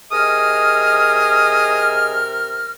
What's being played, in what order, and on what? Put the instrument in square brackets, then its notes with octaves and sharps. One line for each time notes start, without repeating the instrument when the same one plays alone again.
[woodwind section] C3 A#4 F6 [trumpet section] G#4 D#5 [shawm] D#6